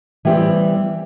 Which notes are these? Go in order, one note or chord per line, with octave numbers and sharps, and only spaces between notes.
E3 G3 B3 C4 G4